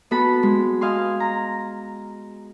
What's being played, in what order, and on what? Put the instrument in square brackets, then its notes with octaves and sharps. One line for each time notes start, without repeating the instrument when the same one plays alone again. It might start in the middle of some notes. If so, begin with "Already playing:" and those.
[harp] B3 F#4 A4 B5
G#3
D#5 F5 G#5 C6
A#5